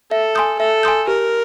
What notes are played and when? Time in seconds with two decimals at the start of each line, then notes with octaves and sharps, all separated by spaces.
0.11 A4 E5
0.35 G#5 C6 D#6 G6
0.59 A4 E5
0.83 G#5 C6 D#6 G6
1.07 G4 A#4